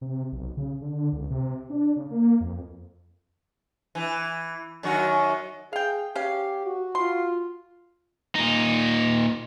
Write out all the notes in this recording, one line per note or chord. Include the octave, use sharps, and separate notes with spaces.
C3
B1
C#3
D3
C#2
C3
D4
C#3
A#3
F2
E3
F#2 D#3 F#4
G#4 F5 G5
C#4 G4 F5
F#4
F4 C6
A#2 D#4